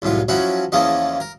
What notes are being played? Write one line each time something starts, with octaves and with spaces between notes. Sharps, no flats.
C2 F#2 A2 F4
F3 F#3 C#4 E4 F#4
E2 C#3 F3 A3 A#3 D#5
A#4